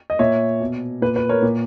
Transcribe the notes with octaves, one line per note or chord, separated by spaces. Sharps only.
D#5
A#2 C#5 E5
B2
A#2 B4
B4
A#4 C#5
A#2